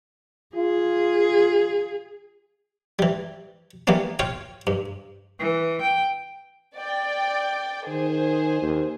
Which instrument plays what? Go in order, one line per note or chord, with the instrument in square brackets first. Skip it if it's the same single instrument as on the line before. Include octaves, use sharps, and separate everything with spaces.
[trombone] F4 [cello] G#4
[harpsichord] E3 G3
E3 G3 A#3 B3 C#4
F4 C#5 F5 G5
G2
[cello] E3
G5
[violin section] D5 G5
[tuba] D#3 [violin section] G#4 C5
[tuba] D#2